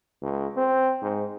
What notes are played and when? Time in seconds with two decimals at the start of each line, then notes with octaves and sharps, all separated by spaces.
0.22 C#2
0.57 C4
1.02 G#2